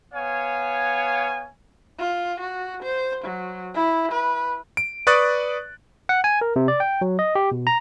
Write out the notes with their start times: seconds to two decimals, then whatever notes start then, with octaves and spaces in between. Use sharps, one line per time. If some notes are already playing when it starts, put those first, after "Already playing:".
0.12 B3 C#5 F5 G#5
1.99 F4
2.40 F#4
2.83 C5
3.25 F#3
3.75 E4
4.12 B4
4.77 D7
5.07 B4 D5 C#6 D#6 F#6 A6
6.09 F#5
6.24 G#5
6.41 A#4
6.56 C3
6.68 D5
6.80 G5
7.01 F#3
7.19 D#5
7.35 G4
7.52 B2
7.67 A#5